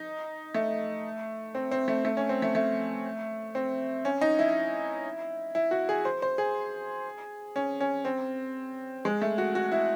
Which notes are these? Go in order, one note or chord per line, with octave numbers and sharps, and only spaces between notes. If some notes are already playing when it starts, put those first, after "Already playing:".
Already playing: D#4
A3
C4
C4
A3
A3
C#4
C4
A3
A3
C4
C#4
D#4
E4
E4
F#4
G#4
C5
C5
G#4
C#4
C#4
C4
G#3
A3
F#4
F#4
E4